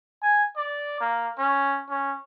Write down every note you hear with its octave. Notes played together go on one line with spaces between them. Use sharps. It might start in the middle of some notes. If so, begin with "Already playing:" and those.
G#5
D5
A#3
C#4
C#4